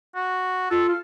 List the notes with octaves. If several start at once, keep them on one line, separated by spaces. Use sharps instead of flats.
F#4
F4 A4
F5